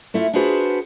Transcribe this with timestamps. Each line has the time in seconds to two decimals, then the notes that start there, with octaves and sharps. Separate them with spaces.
0.14 A3 E4 F4
0.33 D4 F4 F#4 G#4 B4 C5